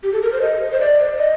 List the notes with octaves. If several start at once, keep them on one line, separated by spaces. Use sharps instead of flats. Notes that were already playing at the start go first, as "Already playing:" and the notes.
G4
A4
A#4
C5
D#5
C5
D5
D#5